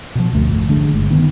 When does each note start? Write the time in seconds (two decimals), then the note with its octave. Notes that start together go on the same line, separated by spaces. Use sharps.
0.15 B2 F3
0.32 F#1 D2 A3
0.49 G#1 F2
0.69 D3 G#3 A3 D4
0.93 G1
1.10 D#3 B3